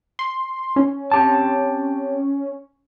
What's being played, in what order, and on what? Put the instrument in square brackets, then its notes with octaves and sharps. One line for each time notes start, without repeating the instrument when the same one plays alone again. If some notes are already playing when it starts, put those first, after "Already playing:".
[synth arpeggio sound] C6
C#4
[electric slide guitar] C4 G4 A5